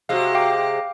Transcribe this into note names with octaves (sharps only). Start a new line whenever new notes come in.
C3 G#3 F#4 F5
F5 G5 D6